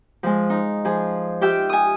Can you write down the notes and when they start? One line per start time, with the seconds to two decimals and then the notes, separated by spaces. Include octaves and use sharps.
0.23 F3 G#3
0.50 D#4
0.85 F3 G#4
1.41 F4 G4 E5 G5
1.69 G#5 D#6